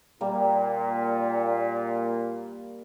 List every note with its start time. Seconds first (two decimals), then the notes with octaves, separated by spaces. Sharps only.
0.21 A#2 G3 A#3